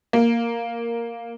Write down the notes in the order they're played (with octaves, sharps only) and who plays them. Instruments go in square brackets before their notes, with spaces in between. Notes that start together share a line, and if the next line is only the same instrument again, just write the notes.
[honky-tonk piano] A#3